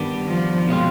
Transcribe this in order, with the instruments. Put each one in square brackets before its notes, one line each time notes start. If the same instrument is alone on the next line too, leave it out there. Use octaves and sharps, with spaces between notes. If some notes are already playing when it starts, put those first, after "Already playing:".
Already playing: [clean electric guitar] G2 D#3 G3 B3 D4
[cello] F3
[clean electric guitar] B2 G#3 C4 F4